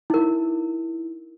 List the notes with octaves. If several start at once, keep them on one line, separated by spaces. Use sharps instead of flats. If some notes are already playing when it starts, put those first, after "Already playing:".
D#4 E4 A#4